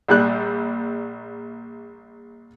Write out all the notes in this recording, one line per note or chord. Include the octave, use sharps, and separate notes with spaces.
A#1 G3 F#6